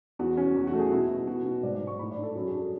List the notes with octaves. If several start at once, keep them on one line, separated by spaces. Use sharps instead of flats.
E2 F#4
C#4
E2
F#4
A3
G#4
B2 E4
B2
B2 F#4
B2
G#2 D5
D5
G#2
C#6
A2 B5
D5
D4
A4
F#2 F#4
G#4
D4
A4